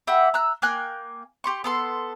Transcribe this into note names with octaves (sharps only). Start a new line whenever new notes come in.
G4 E5 F#5 B5
A#5 E6 F#6
A#3 G5 G#5 F#6
G4 C6 C#6
B3 A4 C6